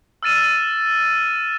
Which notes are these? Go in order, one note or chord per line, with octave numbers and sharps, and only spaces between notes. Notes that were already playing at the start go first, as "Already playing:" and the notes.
E6 F6 A6 D#7 E7